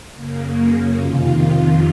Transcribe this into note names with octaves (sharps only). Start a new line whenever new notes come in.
F#2 C#3 A#3
C#4
F2 C3 D#3 F4